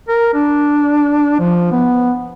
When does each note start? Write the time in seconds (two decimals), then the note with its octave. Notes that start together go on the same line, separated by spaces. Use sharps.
0.09 A#4
0.34 D4
1.40 F3
1.72 B3